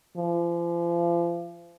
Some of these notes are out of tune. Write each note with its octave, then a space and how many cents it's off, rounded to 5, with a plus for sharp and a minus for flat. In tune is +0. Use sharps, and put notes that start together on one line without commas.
F3 -35